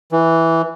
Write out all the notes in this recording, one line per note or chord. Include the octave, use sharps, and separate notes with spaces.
E3